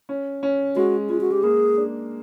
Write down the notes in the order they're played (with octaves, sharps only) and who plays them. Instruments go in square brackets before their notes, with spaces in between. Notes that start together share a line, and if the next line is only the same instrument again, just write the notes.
[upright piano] C#4
C#4
[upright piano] G#3 [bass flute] F#4
[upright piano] G#3 [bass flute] F4
[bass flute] F#4
G4
[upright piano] A#3 [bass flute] G#4
[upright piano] D4